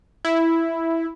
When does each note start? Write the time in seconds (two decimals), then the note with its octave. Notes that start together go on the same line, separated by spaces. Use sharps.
0.25 E4